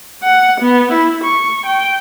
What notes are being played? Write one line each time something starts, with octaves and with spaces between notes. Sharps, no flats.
F#5
B3
E4
C#6
G5